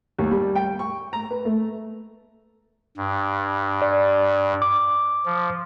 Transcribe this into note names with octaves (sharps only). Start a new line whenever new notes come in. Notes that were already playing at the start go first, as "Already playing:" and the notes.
D#2
G3
G5
C#6
A#5
B4
A3
G2
D5
D6
F3